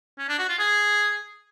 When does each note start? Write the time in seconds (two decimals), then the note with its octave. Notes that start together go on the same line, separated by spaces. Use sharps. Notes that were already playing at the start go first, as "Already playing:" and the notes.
0.19 C#4
0.29 D4
0.39 F#4
0.49 F4
0.59 G#4